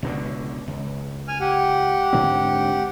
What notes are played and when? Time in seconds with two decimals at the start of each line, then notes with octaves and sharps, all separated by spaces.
0.03 C#2 B2 D3
0.68 C#2
1.28 G#5 F6
1.41 G4 F#5
2.13 G#2 D3 C4